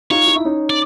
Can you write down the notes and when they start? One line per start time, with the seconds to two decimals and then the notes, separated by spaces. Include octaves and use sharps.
0.10 D#4 F4 C#5
0.27 F4
0.36 E4
0.45 C#4 D#4
0.70 D5